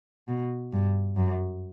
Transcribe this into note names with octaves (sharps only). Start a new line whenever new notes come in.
B2
G2
F#2